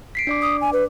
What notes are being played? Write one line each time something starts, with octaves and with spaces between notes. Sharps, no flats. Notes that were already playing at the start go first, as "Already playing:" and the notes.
B6 C7 D7
D4 D5 D6
D#6
G#5
B4